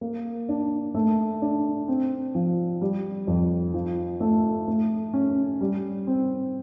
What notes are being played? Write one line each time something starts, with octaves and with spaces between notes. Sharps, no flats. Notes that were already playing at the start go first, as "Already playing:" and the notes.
A#3
D4
A3
D4
C4
F3
G3
F2
F3
A3
A3
C#4
G3
C4